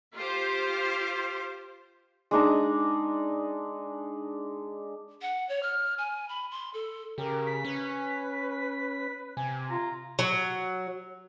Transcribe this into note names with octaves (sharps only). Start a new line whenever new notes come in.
F4 G4 C5
G#3 D4 D#4 A#5
F#5
C#5
F6
G#5
B5
C6
A4
C#3 G4 A#4
B6
C#4 B4
C3 G#5
F4 A#5
F#3